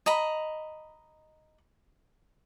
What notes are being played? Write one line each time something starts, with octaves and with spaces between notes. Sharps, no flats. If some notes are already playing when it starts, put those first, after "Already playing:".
D#5 A#5 B5